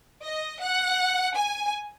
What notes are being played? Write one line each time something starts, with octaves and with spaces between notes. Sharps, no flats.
D#5
F#5
G#5